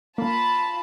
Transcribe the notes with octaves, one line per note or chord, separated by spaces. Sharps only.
A#3 F4 A5 B5